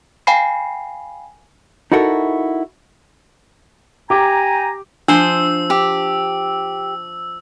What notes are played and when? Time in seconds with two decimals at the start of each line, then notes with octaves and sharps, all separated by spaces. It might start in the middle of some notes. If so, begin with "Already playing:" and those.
0.27 F5 G5 G#5 B5 C7
1.92 D#4 E4 F#4 A4 A#4
4.10 G4 G5 G#5 A#5 D6
5.08 F3 D4 C5 E6
5.70 G4